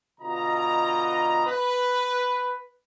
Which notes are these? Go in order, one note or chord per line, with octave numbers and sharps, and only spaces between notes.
B2 D3 F4 D#5 A#5
B4